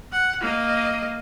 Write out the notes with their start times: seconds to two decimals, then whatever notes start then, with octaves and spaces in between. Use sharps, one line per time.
0.12 F#5
0.41 A#3 D#5